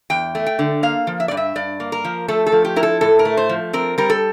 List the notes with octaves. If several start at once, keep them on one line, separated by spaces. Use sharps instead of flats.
E2 G5
A3
G5
D3
A#3 F5
F3
E5
G2 D5
E5
G2 D5
A#3
A#4
F3
A3 A4
A4
F3
G4
E4 A#4
A4
A2 A4
A#4
A3
C5
F3
C4 A#4
G3 A#4
A4